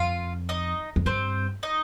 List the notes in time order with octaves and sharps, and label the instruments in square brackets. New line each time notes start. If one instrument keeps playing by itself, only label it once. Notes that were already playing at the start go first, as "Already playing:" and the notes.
Already playing: [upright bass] F2 [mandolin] F4 F5
[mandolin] D#4 D#5
[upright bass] F2
[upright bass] G2 [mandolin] C4 C5
[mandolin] D#4 D#5